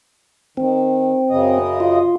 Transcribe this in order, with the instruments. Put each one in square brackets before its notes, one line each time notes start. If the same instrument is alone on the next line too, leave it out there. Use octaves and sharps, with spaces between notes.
[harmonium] D#3 [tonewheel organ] C4
[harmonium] F#2 C#3 D#5
[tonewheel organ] F4